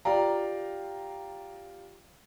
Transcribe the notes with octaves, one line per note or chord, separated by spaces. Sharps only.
F4 G4 D5 F5 G5 A#5